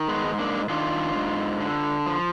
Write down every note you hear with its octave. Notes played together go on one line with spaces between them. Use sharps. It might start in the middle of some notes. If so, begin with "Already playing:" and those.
Already playing: D#3
G#3 B3
G#2
A#3 D4
D#3 D4 F4
G#2
D3
F3